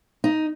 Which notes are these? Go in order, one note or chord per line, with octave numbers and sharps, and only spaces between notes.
D#4